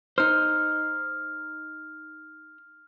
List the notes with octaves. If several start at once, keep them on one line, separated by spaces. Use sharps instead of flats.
D#4 C5 F6